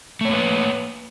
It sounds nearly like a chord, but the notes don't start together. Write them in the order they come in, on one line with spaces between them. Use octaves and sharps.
A3 C#5 A#3 B4